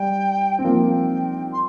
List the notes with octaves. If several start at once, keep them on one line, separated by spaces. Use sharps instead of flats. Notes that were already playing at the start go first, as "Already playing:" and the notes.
Already playing: G3 G5
C4
F3 A#3 G5
C6